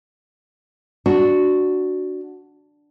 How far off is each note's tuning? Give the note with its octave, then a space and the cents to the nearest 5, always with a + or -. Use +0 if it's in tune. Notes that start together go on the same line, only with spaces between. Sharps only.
D4 +0 F#4 +0